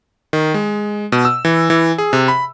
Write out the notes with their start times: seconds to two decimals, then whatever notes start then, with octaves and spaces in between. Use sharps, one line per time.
0.33 D#3
0.54 G#3
1.12 B2
1.25 E6
1.45 E3
1.70 E3
1.98 G#4
2.13 C3
2.28 B5